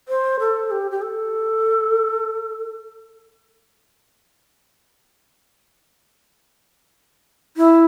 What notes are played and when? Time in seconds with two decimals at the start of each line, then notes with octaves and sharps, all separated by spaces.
0.08 C5
0.40 A4
0.71 G4
0.91 G4
1.02 A4
7.57 E4